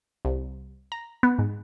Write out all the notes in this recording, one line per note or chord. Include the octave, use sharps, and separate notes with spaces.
C2
A#5
B3
G#2